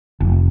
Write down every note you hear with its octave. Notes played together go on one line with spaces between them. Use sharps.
F1